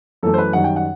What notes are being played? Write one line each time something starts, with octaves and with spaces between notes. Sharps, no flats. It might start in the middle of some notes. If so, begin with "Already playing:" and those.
F#2 E3 A3 A4
C5
B4
F#2 D#3 G3 F#5
G5
F#5